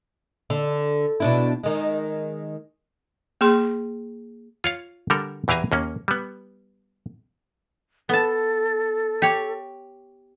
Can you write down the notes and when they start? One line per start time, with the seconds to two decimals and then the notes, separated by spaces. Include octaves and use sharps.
0.50 D3
1.20 B2 D4 E4
1.64 D#3 G#3
3.41 A#3 G#4 C6
4.64 F4 C#5 F5
5.10 D3 G3 A4 A#4
5.48 E2 E3 G4 F5 G#5 A#5
5.72 D#2 A#3 C#4
6.08 G3 B3
8.09 B3 A4 A5
9.22 G4 C#5